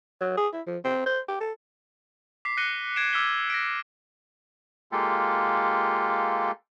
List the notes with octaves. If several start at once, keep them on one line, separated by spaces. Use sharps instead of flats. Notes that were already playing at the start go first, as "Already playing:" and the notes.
F#3
G#4
E4
F3
C4
C5
G4
A4
D6 B6 C7
F#6 A#6 C#7 D#7 G7
G#6 B6 C7 D7 E7
D6 E6 F6 G#6 B6 G7
A#6 B6 D7
G#3 A#3 F4 G4 A4